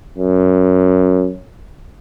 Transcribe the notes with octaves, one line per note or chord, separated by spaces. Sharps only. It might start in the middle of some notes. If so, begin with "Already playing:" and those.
F#2